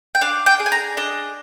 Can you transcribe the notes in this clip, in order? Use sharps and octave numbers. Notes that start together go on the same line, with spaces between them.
G5
D4 F5
G5
G#4
G#5
A#5
D4 D#5